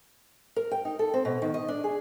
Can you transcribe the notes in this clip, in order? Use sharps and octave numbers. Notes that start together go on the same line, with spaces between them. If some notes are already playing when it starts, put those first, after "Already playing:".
A#4
G5
D#4
A4
C4
B2
D#3
D#5
D4
G#4